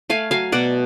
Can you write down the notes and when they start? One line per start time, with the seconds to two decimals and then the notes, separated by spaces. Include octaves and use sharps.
0.10 A3 F5 G#5
0.31 F#3 F5 G#5
0.52 B2 D5 F#5